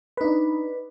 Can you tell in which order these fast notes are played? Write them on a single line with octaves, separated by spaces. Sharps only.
B4 D#4 D4